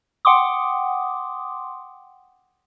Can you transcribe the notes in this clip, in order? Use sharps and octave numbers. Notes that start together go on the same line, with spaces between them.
F#5 G5 C6 D6 D#6